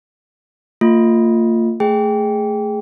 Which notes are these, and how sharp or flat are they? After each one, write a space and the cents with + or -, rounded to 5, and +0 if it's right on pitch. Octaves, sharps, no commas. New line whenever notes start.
A#3 -40 F4 +0
A3 +5 G#4 +0 G5 +0